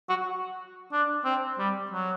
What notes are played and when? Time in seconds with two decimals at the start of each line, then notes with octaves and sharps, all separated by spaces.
0.09 F#4
0.92 D4
1.25 C4
1.59 G3
1.91 F#3